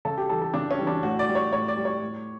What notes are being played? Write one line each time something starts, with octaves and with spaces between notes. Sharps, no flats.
C#3 A4
G4
E3 G3 A4
A4
C#3 D4
C#4
E3 G3
D4
A2 F#4
D5
G3
C#5
A2 C#5
D5
G3
C#5
A2